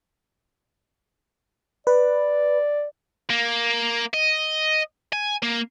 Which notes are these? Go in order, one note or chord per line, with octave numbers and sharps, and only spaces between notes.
B4 D5
A#3
D#5
G#5
A#3